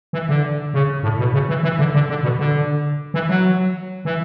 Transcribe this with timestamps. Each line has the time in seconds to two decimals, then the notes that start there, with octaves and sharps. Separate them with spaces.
0.13 E3
0.29 D3
0.74 C#3
1.03 A2
1.19 B2
1.34 C#3
1.49 E3
1.63 E3
1.79 D3
1.94 D3
2.09 D3
2.23 B2
2.39 D3
3.14 E3
3.29 F#3
4.05 E3